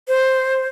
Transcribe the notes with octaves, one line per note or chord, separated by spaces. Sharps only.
C5